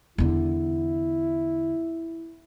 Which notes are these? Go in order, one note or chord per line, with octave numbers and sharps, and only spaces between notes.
E2 D3 E4